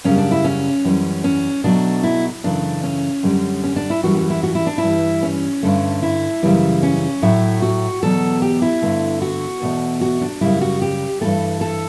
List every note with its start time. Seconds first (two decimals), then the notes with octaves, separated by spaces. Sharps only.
0.04 F#2 C#3 G3 C#4
0.18 D4
0.31 E4
0.44 C#4
0.85 F#2 E3 G3
1.24 C#4
1.64 B2 F#3 A3 D4
2.03 E4
2.44 F#2 C#3 E3 A3 D4
2.83 C#4
3.23 F#2 D3 G3
3.64 C#4
3.76 D4
3.90 E4
4.03 F#2 E3 G3 F#4
4.17 F#4
4.30 E4
4.43 F#4
4.55 E4
4.67 D4
4.78 E4
4.83 G2 E3 G3
5.23 C#4
5.63 G2 D3 A3
6.03 E4
6.43 F#2 C#3 E3 G3
6.83 C#4
7.22 A2 F#3 A3 E4
7.62 F#4
8.02 E2 B2 F#3 A4
8.42 G4
8.62 E4
8.82 G2 D3 A3
9.22 F#4
9.62 E2 B2 A3
10.01 F#4
10.21 D4
10.41 F#2 C#3 G3 E4
10.61 F#4
10.82 G4
11.21 G2 E3 A3 A4
11.61 A4